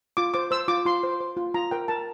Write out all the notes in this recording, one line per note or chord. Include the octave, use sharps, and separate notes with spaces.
F4 D6
C5 D6
C5 E6
F4 D6
F4 C6
C5
C5
F4
F4 A#5
A#4 G5
A#4 A5